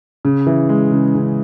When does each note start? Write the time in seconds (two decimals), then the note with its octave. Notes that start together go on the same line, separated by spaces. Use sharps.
0.25 C#3
0.47 E3
0.69 G#3
0.92 C#3
1.15 C#3